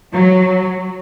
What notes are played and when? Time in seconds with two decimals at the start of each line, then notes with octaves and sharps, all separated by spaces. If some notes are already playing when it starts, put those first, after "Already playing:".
0.12 F#3